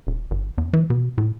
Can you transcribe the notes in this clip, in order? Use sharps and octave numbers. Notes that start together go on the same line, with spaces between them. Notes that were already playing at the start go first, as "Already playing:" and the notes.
D#1
G1
E2
E3
B2
A2